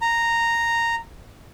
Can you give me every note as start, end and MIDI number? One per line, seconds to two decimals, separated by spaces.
0.02 0.95 82